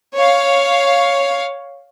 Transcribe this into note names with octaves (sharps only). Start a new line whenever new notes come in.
C#5 F5